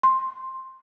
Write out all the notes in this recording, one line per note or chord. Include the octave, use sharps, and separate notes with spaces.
C6